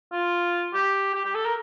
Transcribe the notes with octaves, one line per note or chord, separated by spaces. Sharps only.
F4
G4
G4
G4
A4
A#4